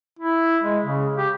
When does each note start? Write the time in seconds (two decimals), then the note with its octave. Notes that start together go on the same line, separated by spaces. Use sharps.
0.19 E4
0.63 G#3
0.85 C#3
1.17 G4